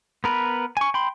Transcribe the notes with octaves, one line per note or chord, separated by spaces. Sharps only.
B3 A#4 B4
G#5 C#6
G5 B5 C6